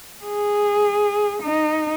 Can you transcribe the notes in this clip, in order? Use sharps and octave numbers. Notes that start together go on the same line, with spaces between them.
G#4
D#4